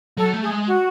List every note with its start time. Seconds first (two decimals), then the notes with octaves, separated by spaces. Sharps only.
0.17 F#3 A4
0.33 A3
0.42 G#4
0.51 G#3
0.66 F#4